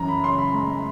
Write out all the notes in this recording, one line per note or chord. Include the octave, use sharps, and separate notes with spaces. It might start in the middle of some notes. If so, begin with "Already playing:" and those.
Already playing: F#2 E3 A#5
B5
C#3 C6
B5
G#3 A#5